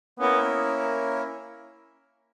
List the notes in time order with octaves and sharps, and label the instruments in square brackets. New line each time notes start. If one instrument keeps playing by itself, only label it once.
[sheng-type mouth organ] A#3 C#4 E4 A#4 [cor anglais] B3